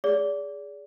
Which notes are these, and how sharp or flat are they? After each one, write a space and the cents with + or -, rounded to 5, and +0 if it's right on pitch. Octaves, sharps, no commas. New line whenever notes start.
G#4 -10 D5 -30